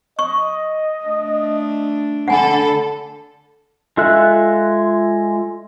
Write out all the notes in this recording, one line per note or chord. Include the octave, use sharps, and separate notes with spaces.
D#5 C#6
A3 D4
D3 A4 F#5 G#5 B5
G#3 F4 A4 E5 F#6